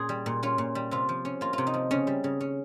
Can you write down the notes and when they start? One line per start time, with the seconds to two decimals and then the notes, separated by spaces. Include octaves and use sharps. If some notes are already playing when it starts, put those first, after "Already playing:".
Already playing: A#2 C#4 G#4
0.09 G3
0.26 A#2
0.43 C#4 F4
0.58 A#2
0.75 G3
0.91 C3 F4
1.09 F3
1.25 C#4
1.41 A#3 F4
1.53 C3 F4
1.67 D#4
1.74 F3
1.91 C#3 C#4
2.07 G3
2.24 C#3
2.41 C#4